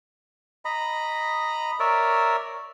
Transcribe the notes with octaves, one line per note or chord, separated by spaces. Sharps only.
D#5 A#5 B5
A#4 C#5 D5 E5